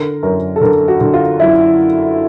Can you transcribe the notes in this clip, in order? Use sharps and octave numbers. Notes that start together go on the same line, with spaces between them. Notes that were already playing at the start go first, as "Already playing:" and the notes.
Already playing: D3 A#4
F#2 A#4
A4
D3 A#4
F#4
D3
F4
F#2 E4